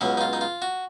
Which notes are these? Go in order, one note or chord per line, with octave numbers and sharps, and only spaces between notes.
C#2 B2 F#3 C#4
D#4
F4
D#4
F4
F#4